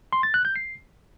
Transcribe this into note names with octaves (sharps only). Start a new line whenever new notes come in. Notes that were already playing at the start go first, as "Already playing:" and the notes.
C6
A6
F#6
G6
C7